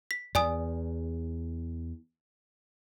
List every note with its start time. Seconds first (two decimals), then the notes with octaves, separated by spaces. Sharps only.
0.11 B6
0.35 E2 D5 G#5 D#6